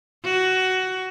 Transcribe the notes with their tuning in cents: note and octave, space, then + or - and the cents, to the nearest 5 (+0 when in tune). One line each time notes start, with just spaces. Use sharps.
F#4 +15